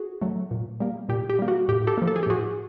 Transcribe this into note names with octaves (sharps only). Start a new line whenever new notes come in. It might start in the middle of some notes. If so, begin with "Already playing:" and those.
Already playing: F#4 G#4
F#3 A3
A#2
G3 A#3
A#2 G4
G4
G3 A#3
F#4
A2 G4
G4 A4
F3 A#3
A4
G#4
G4
A2 F#4 G#4